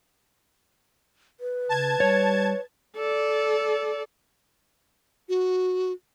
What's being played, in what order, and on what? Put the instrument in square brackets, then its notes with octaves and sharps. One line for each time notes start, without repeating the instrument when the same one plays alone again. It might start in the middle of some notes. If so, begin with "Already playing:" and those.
[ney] B4
[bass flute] C#3 [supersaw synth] A5 G#6
[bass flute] G3 [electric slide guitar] C#5
[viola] A4 D5
[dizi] F#4